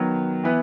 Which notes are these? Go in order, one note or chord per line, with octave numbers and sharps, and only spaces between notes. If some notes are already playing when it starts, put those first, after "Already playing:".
Already playing: D#3 F#3 B3
E3 B3 E4 B4